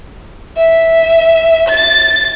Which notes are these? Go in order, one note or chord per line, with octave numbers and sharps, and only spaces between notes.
E5
A6